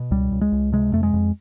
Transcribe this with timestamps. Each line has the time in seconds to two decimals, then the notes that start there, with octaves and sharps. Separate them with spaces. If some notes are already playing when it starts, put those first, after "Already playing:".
Already playing: B2
0.11 C#2 G3
0.32 C#2
0.41 G#3
0.52 C#2
0.72 C3 G#3
0.93 F2 A3
1.03 G#3
1.14 F2